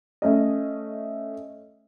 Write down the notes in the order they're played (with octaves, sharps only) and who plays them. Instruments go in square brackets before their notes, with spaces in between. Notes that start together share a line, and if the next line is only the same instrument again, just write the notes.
[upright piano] A3 C#4 D#5